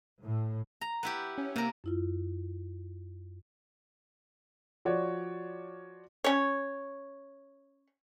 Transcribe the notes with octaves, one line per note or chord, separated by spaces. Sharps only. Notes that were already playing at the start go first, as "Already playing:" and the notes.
A2
A#5
B3 E4 G4
C#4
C3 A#3 A#4
F#2 E4 F4
F3 F#4 C#5 D5
C#4 C#5